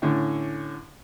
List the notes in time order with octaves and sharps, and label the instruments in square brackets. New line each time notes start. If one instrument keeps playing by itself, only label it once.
[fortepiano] A2 D3 C#4